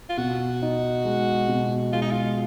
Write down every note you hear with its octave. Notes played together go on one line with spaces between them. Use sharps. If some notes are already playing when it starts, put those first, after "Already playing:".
F4
B2 F#4
D#4
G#3
B2
G#3 F4
D#4
F4